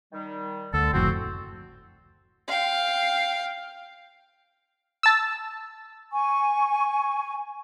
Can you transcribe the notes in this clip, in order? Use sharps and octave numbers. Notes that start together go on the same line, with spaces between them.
D#3 G3
D2 D3 A4
F#1 F2 A2 C4 F#4
F5 G5
A5 E6
G#5 C#6